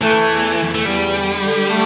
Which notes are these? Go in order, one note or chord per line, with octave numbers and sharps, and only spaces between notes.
E3 A3
E2
E2
A3
E2 G3
D3
D3
A3